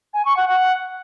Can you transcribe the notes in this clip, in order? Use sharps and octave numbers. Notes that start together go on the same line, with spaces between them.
G#5
C#6
F#5
F#5